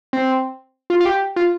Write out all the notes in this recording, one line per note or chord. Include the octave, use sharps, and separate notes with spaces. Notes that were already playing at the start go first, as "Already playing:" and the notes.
C4
F4
F4
G4
F4